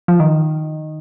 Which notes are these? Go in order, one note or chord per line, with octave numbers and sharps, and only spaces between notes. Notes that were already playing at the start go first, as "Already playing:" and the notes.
F3
D#3